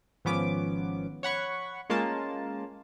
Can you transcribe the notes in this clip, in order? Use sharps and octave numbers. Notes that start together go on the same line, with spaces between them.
G#1 F3 B3 C#4 D6
C#5 F#5 B5 C#6
G#3 A#3 C#4 F4 A5